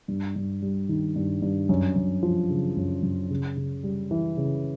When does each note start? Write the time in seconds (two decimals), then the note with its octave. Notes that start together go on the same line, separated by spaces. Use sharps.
0.08 G2
0.36 G2
0.62 G3
0.89 D#3
1.16 G2
1.42 G2
1.69 F#2
1.96 F#2
2.23 F3
2.50 C#3
2.77 F#2
3.03 F#2
3.30 C#3
3.57 C#3
3.83 G3
4.11 E3
4.37 C#3